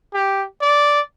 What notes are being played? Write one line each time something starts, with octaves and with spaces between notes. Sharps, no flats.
G4
D5